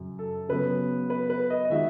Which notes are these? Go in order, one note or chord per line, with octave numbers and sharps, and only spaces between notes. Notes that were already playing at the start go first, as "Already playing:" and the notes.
Already playing: F#2 C#3 F#3
A4
C#3 F#3 B3 B4
B4
B4
D#5
D#5
D#3 G#3 D#4 F#4 E5